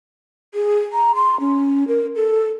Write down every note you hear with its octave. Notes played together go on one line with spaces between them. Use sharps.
G#4
A#5
C6
C#4
A#4
A4